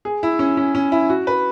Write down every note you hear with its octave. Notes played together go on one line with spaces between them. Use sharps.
G#4
E4
C#4
C#4
C#4
E4
F#4
B4